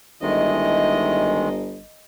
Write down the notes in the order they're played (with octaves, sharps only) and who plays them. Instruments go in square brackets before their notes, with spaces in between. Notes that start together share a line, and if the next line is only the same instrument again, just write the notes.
[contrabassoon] G1 [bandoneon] D#3 G#3 [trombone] E4 [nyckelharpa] D#5